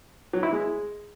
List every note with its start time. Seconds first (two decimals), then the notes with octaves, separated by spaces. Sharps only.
0.33 F#3
0.43 E4
0.52 G#3